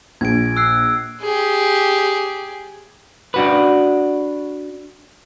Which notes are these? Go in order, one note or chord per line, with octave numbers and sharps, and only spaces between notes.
A#1 G#6 D7
E6 F#6 C7
G4 G#4
D4 F#4 B4